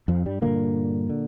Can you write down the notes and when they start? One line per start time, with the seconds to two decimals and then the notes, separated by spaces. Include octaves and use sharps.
0.08 F2 F3
0.26 G2 G3
0.42 G2 A#2 D3 A#3
1.09 D3